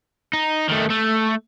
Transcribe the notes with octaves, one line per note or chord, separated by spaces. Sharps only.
D#4
D#3 A3
A3